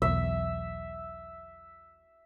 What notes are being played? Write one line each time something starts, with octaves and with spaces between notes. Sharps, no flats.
B1 E2 E5